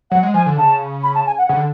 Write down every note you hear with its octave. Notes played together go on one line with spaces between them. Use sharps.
F#3 F#5
G#3
F3 G#5
D3
C#3 A5
B5
A5
G#5
F#5
C#3 F#5
D3